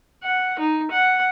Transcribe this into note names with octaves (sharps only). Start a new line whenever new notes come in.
F#5
D#4
F#5